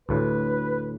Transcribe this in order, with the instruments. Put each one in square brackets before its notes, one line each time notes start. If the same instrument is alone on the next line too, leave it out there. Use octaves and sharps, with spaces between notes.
[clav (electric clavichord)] D2 A2 [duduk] B4